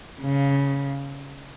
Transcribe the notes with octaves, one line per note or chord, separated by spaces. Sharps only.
C#3